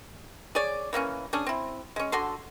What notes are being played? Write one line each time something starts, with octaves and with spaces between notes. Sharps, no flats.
G#4 C#5 D5
E3 A#3 C4 C#4
C#4 D4 G#4
C4 E4
G#3 C#4
D3 F#4 A4 C6